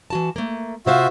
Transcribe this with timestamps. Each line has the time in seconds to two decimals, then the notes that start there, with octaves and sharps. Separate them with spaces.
0.10 E3 F#4 A5
0.36 A3 A#3
0.86 C3 F4 F#4 C5 E5 F5